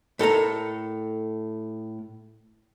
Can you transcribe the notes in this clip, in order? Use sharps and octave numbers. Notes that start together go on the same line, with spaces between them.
A2 A4 A#4 A#5